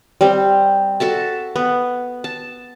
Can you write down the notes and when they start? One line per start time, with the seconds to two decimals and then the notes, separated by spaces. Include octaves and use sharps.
0.21 G3 C4
1.00 F#4 A4 E5 A5
1.56 B3
2.24 A5